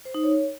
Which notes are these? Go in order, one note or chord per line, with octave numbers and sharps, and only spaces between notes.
C5
D#4
C#5